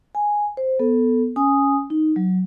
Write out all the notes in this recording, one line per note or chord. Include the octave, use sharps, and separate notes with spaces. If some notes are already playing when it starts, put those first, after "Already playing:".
G#5
C5
B3 A4
C#4 G#5 D#6
D#4
F#3